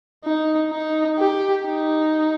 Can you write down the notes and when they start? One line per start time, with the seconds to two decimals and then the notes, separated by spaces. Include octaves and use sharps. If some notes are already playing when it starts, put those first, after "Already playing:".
0.24 D#4
0.72 D#4
1.18 G4
1.66 D#4